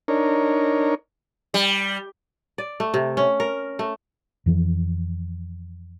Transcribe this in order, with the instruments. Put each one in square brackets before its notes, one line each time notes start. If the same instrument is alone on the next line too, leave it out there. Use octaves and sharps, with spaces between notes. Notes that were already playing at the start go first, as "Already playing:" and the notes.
[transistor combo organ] D4 D#4 A#4 C#5
[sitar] G3
[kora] D5
A3
C3
C#4
A#4
A3
[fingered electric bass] F2 E3 F3